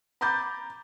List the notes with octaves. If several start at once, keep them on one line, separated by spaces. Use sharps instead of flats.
A#5 B5 D6 G6 A6